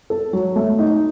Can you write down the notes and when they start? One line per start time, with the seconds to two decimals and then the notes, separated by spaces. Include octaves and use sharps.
0.10 A4
0.33 F#3
0.56 A3
0.79 D#4